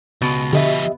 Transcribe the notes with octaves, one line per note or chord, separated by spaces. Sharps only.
C#2 B2
D3 F3 G4 B4 D#5 E5